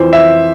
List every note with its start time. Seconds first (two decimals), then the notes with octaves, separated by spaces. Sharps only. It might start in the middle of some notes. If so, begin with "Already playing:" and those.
Already playing: F2 E3 C5
0.13 E5